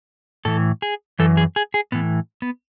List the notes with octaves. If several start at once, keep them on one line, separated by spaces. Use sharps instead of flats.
A2 E3 A4
G#4
F#2 E3 A4
G#4
G#4
G#4
A2 E3 B3
B3